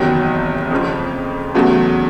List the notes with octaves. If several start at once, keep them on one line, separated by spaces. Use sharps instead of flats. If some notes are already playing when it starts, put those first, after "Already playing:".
Already playing: F#1 E2 C3 D#3 F#3
F2 C#3 F3
E2 C#3 F#3 A3